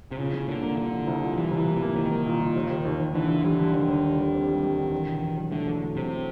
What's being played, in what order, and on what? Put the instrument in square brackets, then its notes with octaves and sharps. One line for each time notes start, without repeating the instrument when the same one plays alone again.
[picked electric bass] C3
[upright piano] A#2 [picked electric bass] C#3
[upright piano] C2
[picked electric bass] D3 [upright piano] A#3
[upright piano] A#3
[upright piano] A#2 [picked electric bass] D3
[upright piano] C2
C2
A#2
[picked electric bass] E3 [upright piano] G3
[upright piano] C2
[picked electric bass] E3
[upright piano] A#3
[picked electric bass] E3
[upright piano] A#3
[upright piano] C2 [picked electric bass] D#3
[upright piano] A#3
A#2
A#2
D#2
D#2
D#2
D#2
[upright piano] D3 [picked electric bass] E3
[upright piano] D#2
[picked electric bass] E3 [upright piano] G3
[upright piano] D3
[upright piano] D#2 [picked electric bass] D#3
[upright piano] D#2
D3
G3
C4
G3
G3
D3
E2
B2
E2
F#3
[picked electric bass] D3 [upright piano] A3
[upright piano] E2
A3
[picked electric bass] C3 [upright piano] F#3
[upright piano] A3